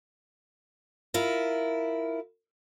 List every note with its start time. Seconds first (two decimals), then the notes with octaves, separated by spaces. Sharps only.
1.14 E4 F4 A#4